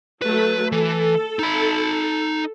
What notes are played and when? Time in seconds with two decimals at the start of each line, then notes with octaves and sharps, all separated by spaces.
0.22 F#3 A3 B4
0.72 E3 A4
1.39 D#4 B5